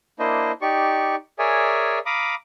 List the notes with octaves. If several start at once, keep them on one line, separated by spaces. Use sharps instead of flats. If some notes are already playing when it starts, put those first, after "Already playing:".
A#3 D4 E4 C5 D#5
D#4 G4 D5 C#6
G#4 A#4 C#5 D5 E5 G#5
F5 A#5 B5 D6 D#6